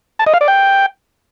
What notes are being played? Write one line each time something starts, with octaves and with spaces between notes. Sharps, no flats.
A5
D#5
F5
D5
G5